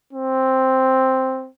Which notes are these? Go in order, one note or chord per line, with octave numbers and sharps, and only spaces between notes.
C4